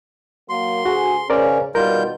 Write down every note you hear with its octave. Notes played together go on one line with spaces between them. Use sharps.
F#3 A#3 C6
D2 F#4 G#4
C#3 C#4 A#4 C5 D5
B2 D#3 G3 D#4 F4 A#4 G6